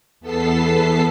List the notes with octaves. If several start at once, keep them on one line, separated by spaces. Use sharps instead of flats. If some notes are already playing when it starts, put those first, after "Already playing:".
E2 B3 A4 A5 B6 C7